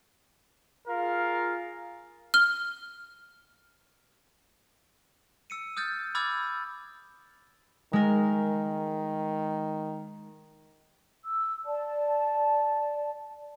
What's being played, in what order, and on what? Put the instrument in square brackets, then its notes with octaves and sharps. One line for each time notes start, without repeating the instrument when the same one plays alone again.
[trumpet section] F4 G#4 A#4 F5
[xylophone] F6 G7
[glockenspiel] E6 C#7 D#7
D#6 F6 G6 A6
B5 D6 E6 F6 G#6 A6
[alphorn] D#3 [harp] G#3 A#4
[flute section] E6
D5 A5